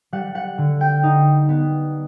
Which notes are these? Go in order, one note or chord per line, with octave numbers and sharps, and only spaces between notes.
G3 F#5
F#5
D3
G5
D#4
B3